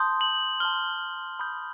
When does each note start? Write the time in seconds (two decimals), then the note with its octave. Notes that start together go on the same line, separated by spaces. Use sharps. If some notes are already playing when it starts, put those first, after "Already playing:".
Already playing: A5 C6 D#6 G6
0.21 F#7
0.60 A5 C6 F6 G7
1.39 B5 D#6 G6